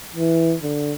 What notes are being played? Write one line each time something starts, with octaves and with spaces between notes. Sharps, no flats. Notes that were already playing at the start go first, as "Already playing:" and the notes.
E3
D3